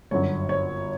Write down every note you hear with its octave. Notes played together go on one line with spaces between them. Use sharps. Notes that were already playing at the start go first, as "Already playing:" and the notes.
G1 F#2 D3 F#3 C#5
C#5